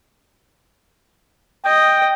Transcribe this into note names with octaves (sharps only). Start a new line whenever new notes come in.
D#5 G5